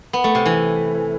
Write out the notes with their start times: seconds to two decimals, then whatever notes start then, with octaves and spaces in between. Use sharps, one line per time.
0.13 B3
0.24 A3
0.35 C3
0.46 E3